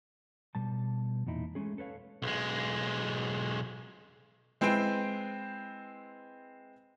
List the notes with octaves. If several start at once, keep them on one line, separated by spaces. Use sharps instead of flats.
B2 G3 A5
E2 A#2 D#4 E4
G#3 A3 C#4 G#4
A4 B4 C#5 F5
B1 G#3
G#3 C4 E4 B4 G5